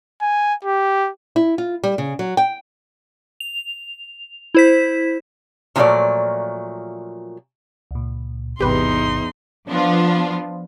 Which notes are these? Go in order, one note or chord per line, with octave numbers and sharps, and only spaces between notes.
G#5
G4
E4
F4
G3
C#3
F#3
G5
F7
E4 C5 B6
A#2 D#3 F3 F#3 A3 D5
C#2 A#2
A1 E2 G#2 C3 D#4 G4 B4 C6
F3 B3 D4 F4